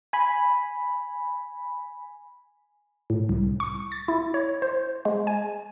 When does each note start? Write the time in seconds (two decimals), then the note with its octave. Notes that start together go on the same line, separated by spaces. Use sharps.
0.13 G#5 B5
3.10 A2
3.29 C2
3.60 C#6
3.92 A6
4.08 E4
4.34 C#5
4.62 C5
5.05 G#3
5.27 G#5